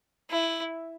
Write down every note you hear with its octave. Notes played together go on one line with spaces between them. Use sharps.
E4